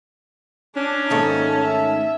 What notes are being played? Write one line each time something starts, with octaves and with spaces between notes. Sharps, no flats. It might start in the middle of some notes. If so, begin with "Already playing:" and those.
C#4 D4
D#2 G#2 A3 D#4 A5
E5